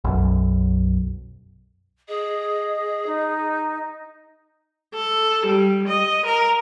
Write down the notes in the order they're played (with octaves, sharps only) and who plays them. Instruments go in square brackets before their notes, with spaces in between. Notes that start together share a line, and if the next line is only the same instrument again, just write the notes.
[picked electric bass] B1 F#2
[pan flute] G#4 [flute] D#5
[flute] D#4
[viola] A4
G3
D#5
A#4